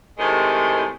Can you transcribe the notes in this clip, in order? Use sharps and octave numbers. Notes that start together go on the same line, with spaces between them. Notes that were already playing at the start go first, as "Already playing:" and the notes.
A2 C3 D#3 G#3